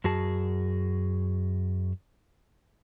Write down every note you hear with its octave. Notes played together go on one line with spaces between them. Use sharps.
F#2 F#4 G#4 A5